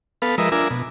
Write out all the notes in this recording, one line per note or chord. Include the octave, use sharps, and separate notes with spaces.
B3 A4 B4 F5
F3 G#3 A#4 B4 D#5 E5
D4 F4 A#4 E5 G#5
B2